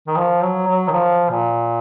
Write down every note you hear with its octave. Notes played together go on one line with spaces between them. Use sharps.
D#3
F3
F#3
F#3
D#3
F3
A#2